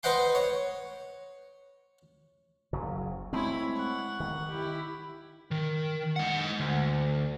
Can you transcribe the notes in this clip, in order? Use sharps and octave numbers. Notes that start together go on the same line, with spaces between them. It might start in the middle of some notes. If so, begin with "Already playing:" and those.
B4 C5 D#5 F#5 G5 C6
C#5
F#1 C#3 F#3
G#3 A3 C4 E4 C#5
F#5 C#6
D#3
E4 G4
D#3
G#3 F#5
D2